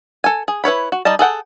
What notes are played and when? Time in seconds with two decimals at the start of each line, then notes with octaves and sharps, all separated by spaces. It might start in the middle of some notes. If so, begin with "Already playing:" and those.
0.24 A4 G#5
0.48 G#4
0.64 E4 B4 C#5 B5
0.92 F#4
1.05 G3 D#4 D#5 A5
1.19 G#4 A4 F#5 G5